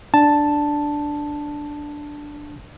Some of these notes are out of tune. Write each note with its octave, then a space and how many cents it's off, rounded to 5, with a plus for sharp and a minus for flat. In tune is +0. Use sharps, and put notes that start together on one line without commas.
D4 +0 A5 +0